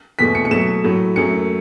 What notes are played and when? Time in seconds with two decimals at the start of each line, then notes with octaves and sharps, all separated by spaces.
0.19 E2 B2 A3 B6
0.35 C#7
0.45 C#7
0.51 B2 F#3 A3 E7
0.84 A2 F#3 A3
1.16 F#2 F#3 A3 C#7